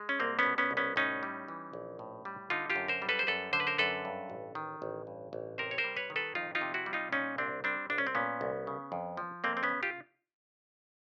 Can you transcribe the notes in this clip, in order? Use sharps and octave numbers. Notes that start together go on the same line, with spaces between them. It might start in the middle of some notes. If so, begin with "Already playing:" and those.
Already playing: G#3
C#4
C2 A#3 C4
B3 C#4
B2
B3 C#4
C2
B3 C#4
A2 C#4 D#4
G3
E3
A#1
A2
G3
D3 D#4 F4
F4 G4
F#2
A#4 C5
G3
A4 B4
C5
F#2 A4 B4
D3 C5
B4
A#4 C5
F#2 A4 B4
G2
A1
D#3
A1
G2
A1
C3 A#4 C5
C#5
A#4 C5
G3
B4 C#5
D#3
A4 B4
F2 D#4 F4
D#4 F4
C3
E4 F#4
G3
D#4 F4
A#2 C#4 D#4
C2 C4 D4
G3 C4 D4
C2 D4
C#4
C4
A#2 B3 C#4
C2
C#3
F2
F3
F2 A#3 C4
C4
B3 C#4
C#3
F4 G4